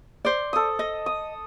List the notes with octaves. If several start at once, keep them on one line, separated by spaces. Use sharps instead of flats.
C5 D5
A4 D#6
D#5
D#6